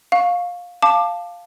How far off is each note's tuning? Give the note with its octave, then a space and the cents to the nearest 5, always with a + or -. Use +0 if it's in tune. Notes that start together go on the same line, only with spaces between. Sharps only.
F5 +20 C#6 +0
F5 +0 A5 +0 D6 +20